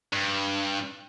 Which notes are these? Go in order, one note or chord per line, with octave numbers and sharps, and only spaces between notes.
G2